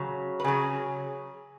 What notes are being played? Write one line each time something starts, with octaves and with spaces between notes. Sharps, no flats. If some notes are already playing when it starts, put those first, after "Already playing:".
Already playing: C#3 F#3
B4
C#3 F#3 G#4